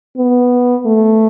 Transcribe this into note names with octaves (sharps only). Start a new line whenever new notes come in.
B3
A3